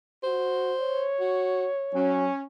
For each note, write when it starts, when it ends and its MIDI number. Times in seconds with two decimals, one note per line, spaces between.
0.23 0.74 66
0.23 1.07 72
0.80 2.22 73
1.20 1.67 66
1.94 2.28 54
1.94 2.43 61